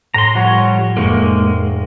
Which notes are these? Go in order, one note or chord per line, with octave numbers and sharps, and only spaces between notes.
A2 A#5 C6
F3 G3 C#5 F#5
F1 G#3 A#3 C#6